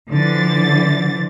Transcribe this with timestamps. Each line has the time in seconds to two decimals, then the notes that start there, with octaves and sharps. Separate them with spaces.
0.10 D3 E3 F3 A6